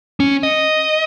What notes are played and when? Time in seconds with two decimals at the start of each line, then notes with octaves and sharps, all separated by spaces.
0.20 C#4
0.43 D#5